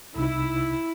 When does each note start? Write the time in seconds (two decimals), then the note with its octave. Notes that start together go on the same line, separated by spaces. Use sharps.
0.16 C2 C3 D#4 E4